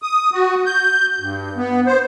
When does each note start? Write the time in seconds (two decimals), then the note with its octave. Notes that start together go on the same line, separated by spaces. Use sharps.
0.02 D#6
0.33 F#4
0.66 G6
1.20 G2
1.57 B3
1.86 C5